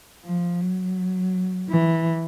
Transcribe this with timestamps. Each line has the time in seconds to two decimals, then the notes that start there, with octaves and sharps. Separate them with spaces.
0.25 F3
0.61 F#3
1.69 E3